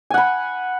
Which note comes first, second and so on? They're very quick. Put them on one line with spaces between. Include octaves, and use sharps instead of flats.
G#5 F#5 B5